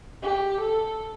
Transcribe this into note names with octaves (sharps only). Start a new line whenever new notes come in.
G4
A4